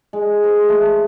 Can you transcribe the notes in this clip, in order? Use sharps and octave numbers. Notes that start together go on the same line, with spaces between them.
G#3
C5
A3